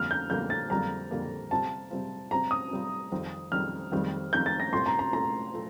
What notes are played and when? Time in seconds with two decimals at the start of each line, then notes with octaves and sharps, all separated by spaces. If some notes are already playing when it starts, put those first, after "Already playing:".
Already playing: F2 D3 G3 A#3 F6
0.11 G6
0.30 F2 D3 G3 A#3 G6
0.50 A6
0.70 F2 D3 G3 A#3 A#5
1.11 F2 D3 G3 A#3
1.51 C3 G3 C4 F4 A5
1.91 C3 G3 C4 F4
2.31 C3 G3 C4 F4 A#5
2.51 D#6
2.71 C3 G3 C4 F4
3.12 F2 D#3 G3 C4
3.52 F2 D#3 G3 C4 F6
3.92 F2 D#3 G3 C4
4.33 F2 D#3 G3 C4 G6
4.46 A6
4.60 A#6
4.72 C2 A#2 A3 C6
4.86 A#5
4.99 A#5
5.12 C2 A#2 A3 A#5
5.53 A#2 A3